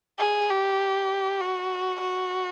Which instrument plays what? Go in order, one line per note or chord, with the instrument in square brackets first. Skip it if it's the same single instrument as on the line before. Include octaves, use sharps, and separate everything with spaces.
[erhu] G#4
G4
F#4
F#4